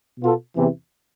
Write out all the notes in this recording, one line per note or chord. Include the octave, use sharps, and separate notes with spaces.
B2 B3 F4 A4
E2 C3 E3